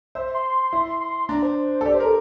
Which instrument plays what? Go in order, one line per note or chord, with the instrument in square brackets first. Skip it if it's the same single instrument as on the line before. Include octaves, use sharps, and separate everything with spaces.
[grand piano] C5 [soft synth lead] E5
[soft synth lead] C6
[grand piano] E4
[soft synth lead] C6
[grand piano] D4 [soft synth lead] A#5
[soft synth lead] C5
[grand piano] A4
[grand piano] G4 [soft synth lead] D5
[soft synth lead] C5
[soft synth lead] A4 [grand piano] A#4